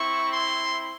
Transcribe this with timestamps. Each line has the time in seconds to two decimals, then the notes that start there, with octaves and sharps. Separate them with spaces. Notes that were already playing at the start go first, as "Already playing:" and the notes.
Already playing: C4 E4 C#6
0.31 C6